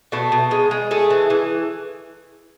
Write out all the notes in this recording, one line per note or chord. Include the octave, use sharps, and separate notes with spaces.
B2 A3
B2
G#3
G#3
A3 G#4
E3
E3